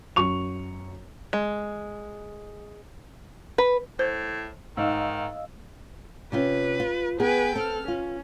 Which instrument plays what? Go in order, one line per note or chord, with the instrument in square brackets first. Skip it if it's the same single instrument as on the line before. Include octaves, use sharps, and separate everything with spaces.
[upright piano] F#2 C#6 F7
[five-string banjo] G#3
B4
[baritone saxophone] A2 [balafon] C5
[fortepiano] G#2 [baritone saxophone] D#3 [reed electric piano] D#5 F5 E6
[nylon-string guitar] C3 C#4 F4 [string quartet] B4
[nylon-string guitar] F4
[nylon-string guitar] B3 G#4 [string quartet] B4 G5 G#5
[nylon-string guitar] C4 [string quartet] A4 F6
[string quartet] C#4 [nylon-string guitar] F4